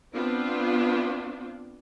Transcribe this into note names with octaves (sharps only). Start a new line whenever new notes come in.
B3 C4 D4 F4